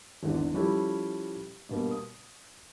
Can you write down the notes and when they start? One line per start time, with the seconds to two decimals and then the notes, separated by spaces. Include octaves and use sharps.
0.23 G#1 E2 D3
0.54 F3 G3 C#4 E4 G4 A4
1.69 G2 B2 A#3
1.91 D#6